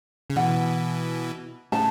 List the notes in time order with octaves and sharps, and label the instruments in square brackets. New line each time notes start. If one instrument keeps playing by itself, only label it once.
[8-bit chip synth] C#3
[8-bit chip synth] B2 E3 [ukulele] F#5
[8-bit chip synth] A2 C#3 [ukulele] A5